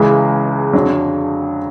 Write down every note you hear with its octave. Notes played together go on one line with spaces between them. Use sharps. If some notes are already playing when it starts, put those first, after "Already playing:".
Already playing: C#2 C#3 E3 G#3
F2 D3 F#3